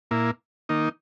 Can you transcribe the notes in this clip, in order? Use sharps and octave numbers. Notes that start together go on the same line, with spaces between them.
A#2 A#3 E4
D#3 A#3 D#4